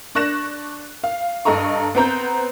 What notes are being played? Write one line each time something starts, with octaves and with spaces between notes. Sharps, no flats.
D4 C#6 F#6 A#6 E7
F5
G2 A4 D#5 A#5 C#6
B3 C4 A#5 G6